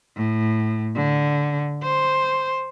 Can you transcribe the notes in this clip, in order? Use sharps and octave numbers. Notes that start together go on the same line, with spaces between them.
A2
D3
C5